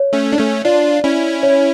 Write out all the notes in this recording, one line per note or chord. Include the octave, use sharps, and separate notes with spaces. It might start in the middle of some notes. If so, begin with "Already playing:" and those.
Already playing: C#5
A3 C#4
D4
A3 C#4
D4 F4 D5
C#4 E4
C#5